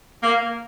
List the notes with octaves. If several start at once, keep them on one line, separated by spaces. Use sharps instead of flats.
A#3